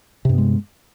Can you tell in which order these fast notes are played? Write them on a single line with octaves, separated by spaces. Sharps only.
C3 G2 B3 G#3